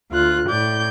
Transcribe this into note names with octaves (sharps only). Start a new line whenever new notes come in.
D2 F4 F#6
A2 D5 G6